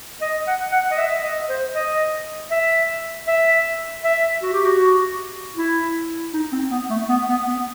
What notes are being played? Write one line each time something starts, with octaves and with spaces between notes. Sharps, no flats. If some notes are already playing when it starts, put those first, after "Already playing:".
D#5
F#5
F#5
D#5
E5
D#5
C5
D#5
E5
E5
E5
F#4
G4
F#4
E4
D#4
C4
B3
A3
B3
B3
B3